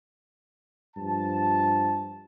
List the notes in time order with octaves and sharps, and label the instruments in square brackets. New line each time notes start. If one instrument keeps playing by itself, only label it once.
[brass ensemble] G2 F3 A5